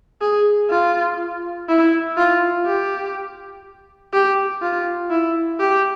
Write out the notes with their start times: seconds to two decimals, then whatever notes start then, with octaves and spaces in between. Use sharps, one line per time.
0.22 G#4
0.71 F4
1.69 E4
2.17 F4
2.66 G4
4.13 G4
4.62 F4
5.11 E4
5.60 G4